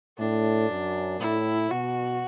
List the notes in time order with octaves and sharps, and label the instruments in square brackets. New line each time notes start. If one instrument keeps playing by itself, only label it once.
[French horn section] A2 [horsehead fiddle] D4
[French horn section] F#2
[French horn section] A2 [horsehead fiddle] E4
[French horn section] B2 [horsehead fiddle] F#4